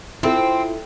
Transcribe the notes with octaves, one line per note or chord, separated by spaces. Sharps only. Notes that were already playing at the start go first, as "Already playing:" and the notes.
C4 E4 F4 A4